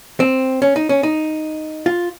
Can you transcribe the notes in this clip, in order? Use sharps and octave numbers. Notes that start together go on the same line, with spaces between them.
C4
C#4
D#4
C#4
D#4
F4